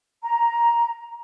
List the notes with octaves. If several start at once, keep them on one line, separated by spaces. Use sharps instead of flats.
A#5